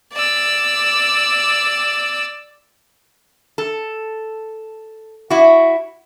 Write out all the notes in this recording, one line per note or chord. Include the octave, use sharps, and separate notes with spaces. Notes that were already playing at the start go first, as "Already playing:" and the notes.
D5 E6
A4
E4 F#4